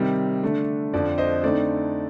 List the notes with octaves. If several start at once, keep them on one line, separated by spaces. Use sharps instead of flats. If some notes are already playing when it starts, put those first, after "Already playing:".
Already playing: C3 D#3 G3
D3 A3 D4
F2 D3 F3 C4 D5
C5 D#5
D3 A3 C4 D#4 D5